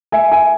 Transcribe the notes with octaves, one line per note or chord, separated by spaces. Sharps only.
E5 G#5
E5 G#5